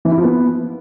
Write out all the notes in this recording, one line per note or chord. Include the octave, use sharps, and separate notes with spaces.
E3
E4
F3
B3